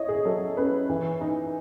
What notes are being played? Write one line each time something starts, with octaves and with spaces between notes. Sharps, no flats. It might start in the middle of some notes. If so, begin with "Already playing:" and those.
Already playing: E4 C#5 D#5
G#4
F#3 A4
C#4 B4
E3
D#4